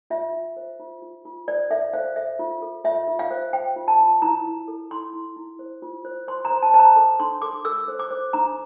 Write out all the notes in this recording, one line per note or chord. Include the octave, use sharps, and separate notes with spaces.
F4 E5
F4
C5
F4
F4
F4
C5 D5
A4 E5
C5 F5
A4 E5
F4
A4
F4 E5
F4
F5
C5
C5 G5
F4
A5
F4
E4 A#5
E4
A4
E4 C6
E4
E4
C5
F4
C5
C5 C6
A#5
C5
A5
C5 A5
A#5
A4
D4 C6
A4 D6
A4 E6
C5
D6
C5
D4 A#5